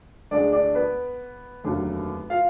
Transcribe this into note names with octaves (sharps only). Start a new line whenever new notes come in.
D2 D3 G#3 D4 D5
D4 D5
B3 B4
F1 D#2 D3 F#3 A#3
F4 F5